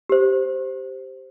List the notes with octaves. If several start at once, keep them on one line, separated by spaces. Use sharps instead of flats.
G4 C5